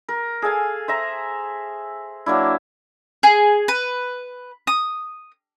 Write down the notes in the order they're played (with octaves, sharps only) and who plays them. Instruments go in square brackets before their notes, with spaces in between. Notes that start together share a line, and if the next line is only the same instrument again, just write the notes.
[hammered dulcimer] A#4
G#4 A4 F5 G#5
C5 E5 A#5
F#3 A#3 D4 E4
[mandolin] G#4
B4
D#6